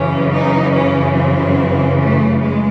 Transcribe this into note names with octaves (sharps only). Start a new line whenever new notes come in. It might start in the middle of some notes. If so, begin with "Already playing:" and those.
Already playing: F#2 C#3 E3 C#4
D#4
C#4
C4
A3
G#3